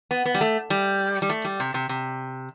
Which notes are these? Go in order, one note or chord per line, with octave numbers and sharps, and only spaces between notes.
B3
B3
G3
A3
G3
G3
A3
G3
C3
C3
C3